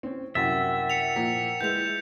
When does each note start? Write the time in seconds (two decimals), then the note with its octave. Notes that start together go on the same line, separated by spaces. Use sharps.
0.03 C4 C#4
0.35 C2 F#2 A#4 E5 F#5 G5 A6
0.90 C#7 F7
1.16 A#2 F3 B6
1.61 G#3 E4 B4 G6 F7